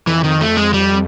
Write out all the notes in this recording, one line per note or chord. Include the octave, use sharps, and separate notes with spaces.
F2 E3
D#3
A3
G#3
G3